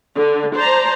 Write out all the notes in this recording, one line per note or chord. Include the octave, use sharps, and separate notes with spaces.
D3
C5 D5 A5 A#5